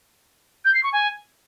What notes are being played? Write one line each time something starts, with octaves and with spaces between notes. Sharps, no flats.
G6
C7
C#6
G#5